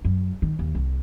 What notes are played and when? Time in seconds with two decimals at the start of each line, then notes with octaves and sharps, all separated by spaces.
0.05 F#2
0.42 D#3
0.59 D#2
0.75 C2